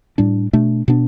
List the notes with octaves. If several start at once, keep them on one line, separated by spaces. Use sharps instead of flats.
A2 G3 D4
B2 A3 D4
B2 B3 D4